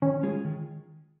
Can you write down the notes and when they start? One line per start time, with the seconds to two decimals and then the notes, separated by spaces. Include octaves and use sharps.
0.02 D#3 C#4
0.23 G#3 F4 G#4
0.45 D#3